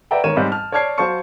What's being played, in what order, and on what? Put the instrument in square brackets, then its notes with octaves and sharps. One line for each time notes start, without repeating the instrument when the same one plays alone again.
[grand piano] B4 D5 E5 F#5 G5 A#5
G#1 A#4 C#5 D#7 E7
G#2 G3 C4
A5 F6
C#5 D5 A5 F6 G#6 C7
F#3 C5 F5 A5 C#6 C#7